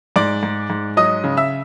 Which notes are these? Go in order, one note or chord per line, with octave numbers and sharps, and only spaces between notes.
G#2 D5 D6
G#2
G#2
F#3 D#5 D#6
C#3
E5 E6